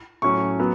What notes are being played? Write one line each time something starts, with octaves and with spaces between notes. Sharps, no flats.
A2 F#3 C#4 C#6
F#3 B3